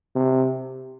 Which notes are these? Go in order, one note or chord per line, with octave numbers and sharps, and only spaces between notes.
C3